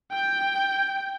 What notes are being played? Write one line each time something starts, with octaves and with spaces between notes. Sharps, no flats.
G5 G6